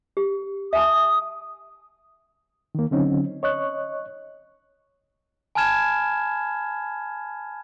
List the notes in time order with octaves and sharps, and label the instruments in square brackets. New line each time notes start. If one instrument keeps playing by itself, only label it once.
[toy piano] G4
[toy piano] E5 G#5 A5 [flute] D#6
[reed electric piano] D#3 A#3
D3 F#3 C4 C#4 D#4
C#5 D#5 C#6 F#6
[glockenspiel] G#5 A5 B5 F6 G#6 E7